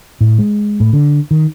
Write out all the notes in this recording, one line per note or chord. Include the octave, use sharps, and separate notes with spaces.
A2
G#3
A2
D3
D#3